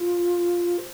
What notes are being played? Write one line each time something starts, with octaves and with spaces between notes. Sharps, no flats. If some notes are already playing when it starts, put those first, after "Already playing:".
Already playing: F4
C5